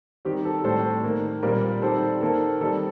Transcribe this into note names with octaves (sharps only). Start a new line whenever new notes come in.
D#3 G3 C4 G4
A4
A2 G3 C4 A4 C5
D#3 A#3
A#2 G3 C4 A#4 D5
D#3 G3 C4 A4 C5
D#3 A#3 A4
D#3 G3 C4 A4